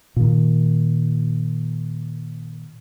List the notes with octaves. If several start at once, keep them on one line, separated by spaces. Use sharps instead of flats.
A#2 D#3